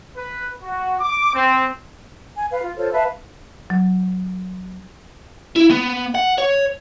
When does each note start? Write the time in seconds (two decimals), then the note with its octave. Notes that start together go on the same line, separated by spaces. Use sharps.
0.17 B4
0.63 F#4
1.00 D6
1.34 C4
2.35 G#5
2.51 B4 F5
2.63 F4
2.76 F4 A4 C5 C#5
2.92 B4 E5 F5 A5
3.70 F#3
5.56 E4
5.71 B3
6.15 F#5
6.38 C#5